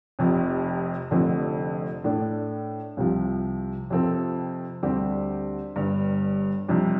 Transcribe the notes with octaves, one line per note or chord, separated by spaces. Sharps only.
F1 F2 C3
F1 F2 D3 A3 C4
A2 A3 D4
C2 C3 F3
F2 C3 F3 C4 A4
D2 D3 G3 C4 G4
G1 G2 G3
F2 C3 G3 D4